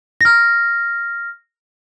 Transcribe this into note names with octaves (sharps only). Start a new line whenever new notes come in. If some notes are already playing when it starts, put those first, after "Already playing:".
F6 A#6